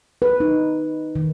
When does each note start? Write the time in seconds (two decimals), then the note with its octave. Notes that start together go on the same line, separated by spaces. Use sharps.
0.22 B4
0.40 D#4
1.16 D#3